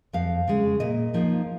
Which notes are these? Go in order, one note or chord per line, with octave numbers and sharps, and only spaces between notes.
F2 F5
C#3 G#3
A#2 D#5
F3 A#3 D#4